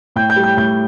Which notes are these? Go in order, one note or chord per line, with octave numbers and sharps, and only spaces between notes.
A2 G5 G6
G5 G6
G3
G5 G6
A2 G5 G6